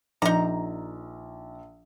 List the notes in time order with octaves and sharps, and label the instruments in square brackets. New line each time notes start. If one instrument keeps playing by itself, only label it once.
[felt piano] A#1 [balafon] F3 [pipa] D#4 A#5